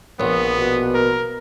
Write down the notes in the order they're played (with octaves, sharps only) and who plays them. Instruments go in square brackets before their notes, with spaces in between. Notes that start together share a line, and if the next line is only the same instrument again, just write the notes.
[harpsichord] A#1 [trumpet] B3
[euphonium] B2
[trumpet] A#4